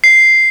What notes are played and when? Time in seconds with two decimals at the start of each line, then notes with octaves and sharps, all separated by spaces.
0.04 C7